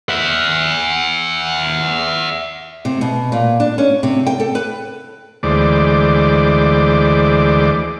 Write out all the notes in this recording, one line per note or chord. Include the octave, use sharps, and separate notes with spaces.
E5 F#5
C3
B2
A#2
D4
C#4
C3
G5
A4
B4
D2 E3 G#3 C5 D5 D6